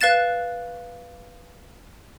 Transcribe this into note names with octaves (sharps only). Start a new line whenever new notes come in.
B4 F5 F#6 A6 E7